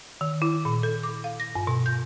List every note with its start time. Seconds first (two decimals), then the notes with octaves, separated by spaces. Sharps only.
0.21 D#3
0.42 E4
0.65 A#2
0.83 A4
1.03 D6
1.24 F5
1.40 A#6
1.55 G2
1.67 B2
1.86 G6